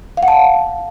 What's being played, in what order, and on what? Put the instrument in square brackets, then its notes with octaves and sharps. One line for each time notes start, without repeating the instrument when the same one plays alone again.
[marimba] F5
F#5
A5